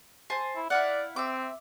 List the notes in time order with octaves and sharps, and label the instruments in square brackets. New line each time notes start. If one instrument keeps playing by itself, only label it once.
[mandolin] C5 G#5 A5
[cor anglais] E4
[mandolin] E4 F5 F#5 [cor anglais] D5
[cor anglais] C4 [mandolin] E5 D6